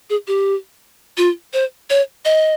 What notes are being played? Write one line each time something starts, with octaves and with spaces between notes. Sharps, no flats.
G#4
G4
F4
C5
C#5
D#5